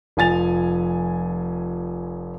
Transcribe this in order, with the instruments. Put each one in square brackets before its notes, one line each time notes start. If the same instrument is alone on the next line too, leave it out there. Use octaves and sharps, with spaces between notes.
[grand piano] F1 F3 G#5 A6 F7